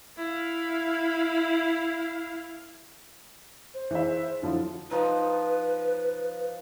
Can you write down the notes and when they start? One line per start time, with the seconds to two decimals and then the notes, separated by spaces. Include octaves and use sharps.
0.17 E4 F5
3.75 C5
3.91 E3 G#4 E5
4.42 D3 F3 F#3 E4
4.91 F3 D#4 B4